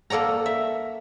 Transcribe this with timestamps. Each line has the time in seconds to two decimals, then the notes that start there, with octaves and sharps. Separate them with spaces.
0.10 A#3 A4 D5 F#5 A#5
0.46 E5